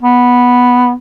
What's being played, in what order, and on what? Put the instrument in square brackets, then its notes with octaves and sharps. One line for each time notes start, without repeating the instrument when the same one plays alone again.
[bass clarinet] B3